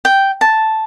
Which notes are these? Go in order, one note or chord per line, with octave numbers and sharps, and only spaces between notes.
G5
A5